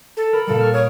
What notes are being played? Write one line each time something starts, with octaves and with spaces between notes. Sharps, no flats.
A4
A#4 B5
A#2 G3 A4
C#6 F6 E7
C#5 D#6 F6 D7